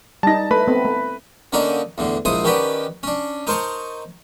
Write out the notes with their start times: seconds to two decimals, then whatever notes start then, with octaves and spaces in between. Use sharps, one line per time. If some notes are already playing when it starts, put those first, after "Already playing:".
0.23 G3 D#4 A5 A#6
0.51 A3 B4 B5
0.67 A3 B3 C4
0.85 A3
1.53 D3 A#3 C#4 D#4 F#4 D5
1.98 E2 A2 D3
2.25 A#1 G#2 E4 G#4 C5 D#6
2.44 D#3 C#4 F#4 G4 B4 D5
3.03 C#4 D4
3.47 D#4 A#4 C5 A5 C#6